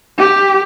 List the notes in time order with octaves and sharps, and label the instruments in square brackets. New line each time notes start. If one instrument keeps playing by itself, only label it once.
[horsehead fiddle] G4